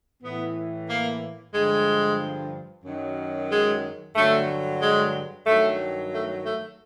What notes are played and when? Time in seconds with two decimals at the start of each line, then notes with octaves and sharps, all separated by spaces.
0.22 A2 E3 B3
0.88 A#3
1.53 G2 D3 F3 G#3
2.84 F#2 D#3 F#3
3.49 G#3
4.15 G2 D3 F#3 A3
4.80 G#3
5.45 G2 D#3 F#3 A3
6.11 A3
6.44 A3